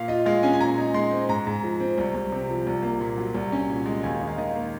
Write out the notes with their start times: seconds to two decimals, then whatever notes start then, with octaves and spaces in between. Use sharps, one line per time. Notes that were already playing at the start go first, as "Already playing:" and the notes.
Already playing: A#2 F5
0.08 F4 D#5
0.26 G#3 F5
0.43 C#4 G#5
0.53 G#5
0.60 A#2 A#5
0.78 D#4
0.94 G#3 C6
1.11 C4
1.29 G#2 A#5
1.47 G#2
1.63 F3
1.80 C4
1.98 C2
2.14 C2
2.32 C3
2.50 F3
2.67 C2
2.83 A#3
3.01 A#2
3.18 F#3
3.34 C2
3.52 C#4
3.70 A#2
3.86 G#3
4.03 D#2 G#5
4.21 D#4
4.28 F5
4.38 D#3 D#5
4.55 A#3